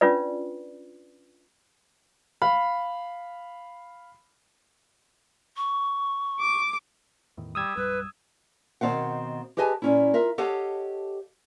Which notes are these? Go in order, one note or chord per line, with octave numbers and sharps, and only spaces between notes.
C#4 D4 F4 B4 D5
F5 B5
C#6
D6
E2 A2 D#3
G3 D#6 E6 G#6
A#1 F#2 G3 B4
B2 D#3 C4 F5 F#5
G4 G#4 B4 D#5 G#5 A5
A#2 C#4 E4
F4 A#4 E5
G4 A4 C#5 D#5 F5 F#5